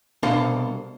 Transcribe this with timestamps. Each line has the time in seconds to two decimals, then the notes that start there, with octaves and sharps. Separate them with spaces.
0.23 C2 B2 D4 A4 C5 F5